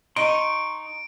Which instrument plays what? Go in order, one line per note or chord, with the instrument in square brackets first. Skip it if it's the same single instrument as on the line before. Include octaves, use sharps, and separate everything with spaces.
[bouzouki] D#4 [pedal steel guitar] C6 C#6 [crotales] D7